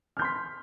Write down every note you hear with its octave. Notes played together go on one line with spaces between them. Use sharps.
C6 F6 G6 B6